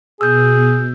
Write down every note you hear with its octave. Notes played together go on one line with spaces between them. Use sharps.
B2 G#4 E6 G6